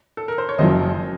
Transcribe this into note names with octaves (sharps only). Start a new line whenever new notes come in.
A4
A#4
C5
C#5
F#1 F#2 F3 C5 D#5